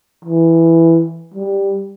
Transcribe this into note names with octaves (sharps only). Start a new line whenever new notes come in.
E3
G3